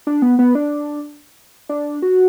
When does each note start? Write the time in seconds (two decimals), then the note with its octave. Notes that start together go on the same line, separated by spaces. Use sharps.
0.07 D4
0.22 B3
0.39 B3
0.55 D4
1.69 D4
2.02 F#4